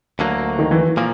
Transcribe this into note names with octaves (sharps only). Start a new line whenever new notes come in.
D2 D3 F#3 A#3
D#3
E3
A#2 F3 A#3